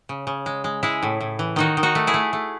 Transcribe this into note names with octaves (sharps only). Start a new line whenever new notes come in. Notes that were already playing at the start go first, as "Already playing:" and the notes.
C#3
C#3
G#3
G#3
G#3 E4 G#4
A2
A2
E3
D#3 D#4 F#4
D#3
D#4 F#4
A3
E4 G#4
A3
A3